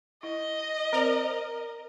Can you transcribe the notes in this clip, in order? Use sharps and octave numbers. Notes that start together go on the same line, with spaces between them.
E4 D#5
C4 A#4 C5 D5